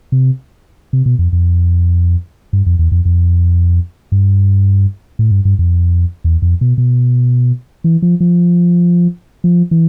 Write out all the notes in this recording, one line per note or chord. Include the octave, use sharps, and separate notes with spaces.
C3
C3
B2
F2
F2
G2
F2
E2
F2
F2
G2
A2
G2
G2
F2
E2
F2
B2
B2
E3
F3
F3
F3
E3